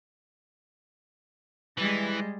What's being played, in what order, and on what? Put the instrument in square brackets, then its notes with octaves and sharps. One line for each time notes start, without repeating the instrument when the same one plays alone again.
[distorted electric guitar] E3 [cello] G3 G#3